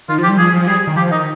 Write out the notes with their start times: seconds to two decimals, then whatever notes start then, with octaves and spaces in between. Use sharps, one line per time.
0.09 D#3 F4
0.18 F3 G4
0.29 G3
0.38 F3 G#4
0.53 F3
0.67 G3 G#4
0.87 D#3
0.96 F3 G4
1.11 D#3 D#4